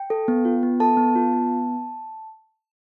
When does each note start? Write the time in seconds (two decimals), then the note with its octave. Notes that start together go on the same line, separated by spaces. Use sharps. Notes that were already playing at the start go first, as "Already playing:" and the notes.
Already playing: G5
0.10 A4
0.28 B3
0.45 F4
0.63 B3
0.80 A4 A5
0.97 B3
1.16 F4
1.33 B3